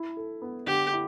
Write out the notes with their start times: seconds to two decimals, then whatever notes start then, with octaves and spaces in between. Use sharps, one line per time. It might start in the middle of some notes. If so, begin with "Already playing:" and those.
Already playing: E4
0.17 A4
0.42 B3
0.67 D3 G4
0.93 E4